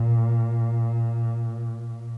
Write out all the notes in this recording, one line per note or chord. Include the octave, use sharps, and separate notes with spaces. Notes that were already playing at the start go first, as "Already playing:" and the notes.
Already playing: A#2